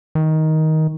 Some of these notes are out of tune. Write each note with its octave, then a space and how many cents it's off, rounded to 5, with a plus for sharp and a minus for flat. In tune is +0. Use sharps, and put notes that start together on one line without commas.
D#3 +15